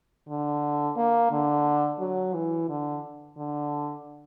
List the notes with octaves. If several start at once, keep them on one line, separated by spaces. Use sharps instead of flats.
D3
A#3
D3
F#3
E3
D3
D3